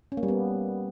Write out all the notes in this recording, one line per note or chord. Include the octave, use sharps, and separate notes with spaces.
C#4
A#3
G3
B3